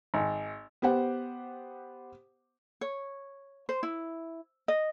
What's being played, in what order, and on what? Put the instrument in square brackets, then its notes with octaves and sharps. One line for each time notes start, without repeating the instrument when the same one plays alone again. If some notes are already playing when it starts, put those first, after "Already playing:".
[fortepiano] G#1
[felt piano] B3 G4 C5 F#5
[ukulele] C#5
C5
E4
D#5